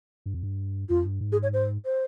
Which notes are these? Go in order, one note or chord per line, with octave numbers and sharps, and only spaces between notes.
G2
F2
G2
F2 F4
G2
G#2
G#4
C#5
C5
C5